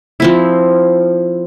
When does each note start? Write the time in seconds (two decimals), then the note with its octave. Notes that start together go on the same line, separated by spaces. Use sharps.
0.20 F3 C4 E4